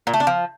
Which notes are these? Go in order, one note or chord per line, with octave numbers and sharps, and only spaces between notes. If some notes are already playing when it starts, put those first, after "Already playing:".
A#2
A3
D4
F3